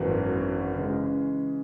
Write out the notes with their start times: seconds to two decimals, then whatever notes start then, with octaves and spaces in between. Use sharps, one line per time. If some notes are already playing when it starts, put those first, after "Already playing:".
Already playing: G#1 F#2 E3 B3 F#4
0.74 C#3 E3 G#3